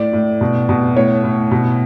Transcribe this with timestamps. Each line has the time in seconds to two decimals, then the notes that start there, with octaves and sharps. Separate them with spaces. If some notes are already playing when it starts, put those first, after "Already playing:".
Already playing: A2 D5
0.13 A2
0.41 B2
0.69 B2
0.96 A2 C#5
1.24 A2
1.51 B2